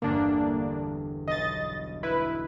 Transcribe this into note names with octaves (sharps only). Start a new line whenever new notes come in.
G1 E2 A#3 D4
B1 D#5 A6
E4 B4